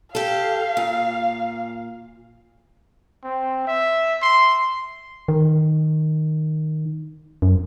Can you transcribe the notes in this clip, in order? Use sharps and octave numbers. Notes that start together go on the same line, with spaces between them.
G4 A4 F5
A#2
C4
E5
C6
D#3
F#2